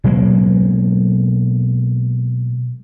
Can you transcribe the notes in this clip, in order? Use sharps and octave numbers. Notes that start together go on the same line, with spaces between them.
B2 F#3 G#3 A#3